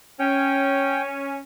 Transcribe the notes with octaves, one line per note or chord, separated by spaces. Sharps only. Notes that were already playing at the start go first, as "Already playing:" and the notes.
C#4 G5